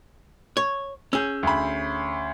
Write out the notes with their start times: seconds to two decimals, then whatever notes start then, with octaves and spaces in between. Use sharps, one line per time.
0.57 C#5
1.13 C#4 G#4 E6 G6
1.43 D2 B5